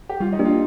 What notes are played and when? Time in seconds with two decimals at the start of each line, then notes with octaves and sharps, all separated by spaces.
0.09 G4
0.20 G3 F4
0.33 D#4
0.39 A#3 D4 G4
0.45 F4